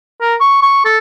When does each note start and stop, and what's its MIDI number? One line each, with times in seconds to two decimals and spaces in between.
0.21 0.35 70
0.41 0.62 85
0.63 0.81 85
0.85 0.98 69